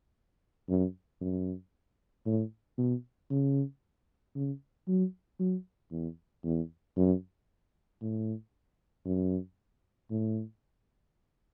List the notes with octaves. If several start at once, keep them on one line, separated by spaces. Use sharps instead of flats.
F#2
F#2
A2
B2
C#3
C#3
F#3
F#3
E2
E2
F#2
A2
F#2
A2